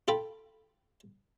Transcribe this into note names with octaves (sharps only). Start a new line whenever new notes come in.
F4 A4 G5 B5